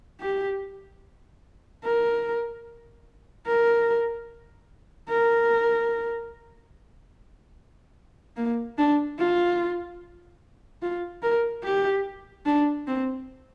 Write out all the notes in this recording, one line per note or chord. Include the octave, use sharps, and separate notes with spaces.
G4
A#4
A#4
A#4
A#3
D4
F4
F4
A#4
G4
D4
C4